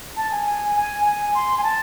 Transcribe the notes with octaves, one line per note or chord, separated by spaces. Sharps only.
A5
G#5
G#5
G#5
G#5
C6
G#5
A5